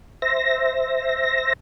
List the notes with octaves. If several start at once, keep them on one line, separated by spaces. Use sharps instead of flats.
C5 E5 A#6